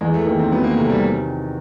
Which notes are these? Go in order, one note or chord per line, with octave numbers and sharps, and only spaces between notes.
E2 G#3
A3
D#3 A#3
C4
F#3 B3
A#3
C3 A3
G3